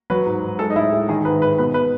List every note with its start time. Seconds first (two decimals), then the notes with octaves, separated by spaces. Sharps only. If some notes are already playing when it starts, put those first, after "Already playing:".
0.10 F#3 B4
0.26 G#2
0.42 G#2
0.59 G#3 A4
0.70 D#4
0.76 A2 E4
0.92 G#3
1.09 D#3 G#4
1.25 G#2 B4
1.42 G#2 B4
1.58 B2 B4
1.74 B4